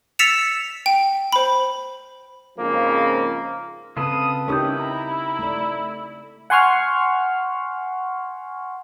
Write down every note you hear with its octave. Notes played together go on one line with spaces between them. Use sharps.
E6 A6 B6 C#7 E7 F7
G5
C5 B5
F2 G#2 C#3 F3 A#3 F4
C#3 C4 F4 A4 B4 D#6
C#4 D#4 E4 G4 A#4 D#6 G6
A#5
A3 D5
F#5 G#5 C6 C#6 F6